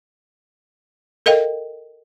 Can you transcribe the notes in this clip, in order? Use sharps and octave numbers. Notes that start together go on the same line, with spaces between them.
A4 A#4 D#5 F5 G5